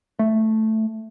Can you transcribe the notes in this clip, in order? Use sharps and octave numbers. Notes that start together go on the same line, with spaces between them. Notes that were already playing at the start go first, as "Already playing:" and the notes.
A3